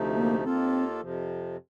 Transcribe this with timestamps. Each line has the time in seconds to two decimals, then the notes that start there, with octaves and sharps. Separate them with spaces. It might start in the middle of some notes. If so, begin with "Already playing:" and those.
Already playing: D2 C3 F3 A3 D#4
0.16 A#3
0.44 D#2 D#3 A#3 C4 F4 A4
1.00 F2 C3 F3